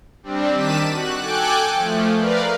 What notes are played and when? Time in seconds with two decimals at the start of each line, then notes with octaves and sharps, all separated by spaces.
0.23 G3 C4 D4
0.54 D#3 A5 D6 B6 D#7 E7
0.88 F#4 F#6
1.19 A4 G5 G#5 D6 F#6
1.75 F3 A3
2.18 A#4 B4 D5 F5